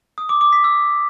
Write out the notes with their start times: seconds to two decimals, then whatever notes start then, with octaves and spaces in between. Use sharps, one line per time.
0.18 D#6
0.29 D6
0.41 D6
0.53 B6
0.64 E6